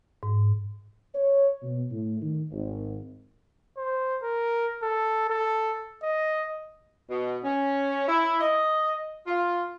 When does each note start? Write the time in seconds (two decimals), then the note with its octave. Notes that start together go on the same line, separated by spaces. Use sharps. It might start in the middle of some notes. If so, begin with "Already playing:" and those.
0.23 G#2
1.15 C#5
1.63 B2
1.91 A2
2.22 D#3
2.51 G#1
3.77 C5
4.23 A#4
4.83 A4
5.30 A4
6.03 D#5
7.10 B2
7.45 C#4
8.07 E4
8.41 D#5
9.27 F4